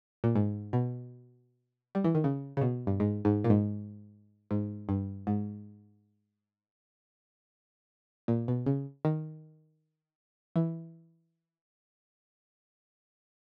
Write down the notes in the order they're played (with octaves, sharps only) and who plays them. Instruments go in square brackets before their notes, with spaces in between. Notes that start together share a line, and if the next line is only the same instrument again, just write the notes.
[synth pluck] A#2
G#2
B2
G3
E3
D#3
C#3
C#3
B2
G2
G#2
G#2
A#2
G#2
G#2
G2
G#2
A#2
B2
C#3
D#3
E3